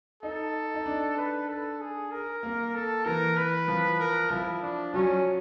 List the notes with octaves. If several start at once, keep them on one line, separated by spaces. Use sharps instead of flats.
D#4 A4
D#4
D4
B4
A4
G#4
A#4
A#3
A4
E3 A#4
B4
F3
A#4
F3 E4
D4
F#3 C#4